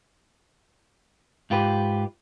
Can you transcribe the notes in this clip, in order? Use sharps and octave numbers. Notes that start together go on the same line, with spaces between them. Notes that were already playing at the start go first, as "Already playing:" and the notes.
G#2 F4 G4 B4